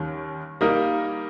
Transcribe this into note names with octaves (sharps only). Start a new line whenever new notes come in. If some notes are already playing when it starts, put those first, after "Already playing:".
Already playing: D#2 D#3 G3 C#4
G3 A#3 D#4 A#4